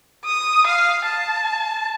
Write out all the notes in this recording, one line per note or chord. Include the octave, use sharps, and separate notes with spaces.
D#6
F5
A5